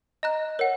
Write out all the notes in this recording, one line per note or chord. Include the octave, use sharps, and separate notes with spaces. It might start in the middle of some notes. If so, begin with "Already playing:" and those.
D#5 A#5 F#6
A#4 C#5 F#5